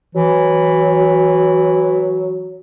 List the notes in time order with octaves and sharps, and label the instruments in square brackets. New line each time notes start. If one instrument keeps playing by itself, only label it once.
[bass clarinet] E3 [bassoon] F#3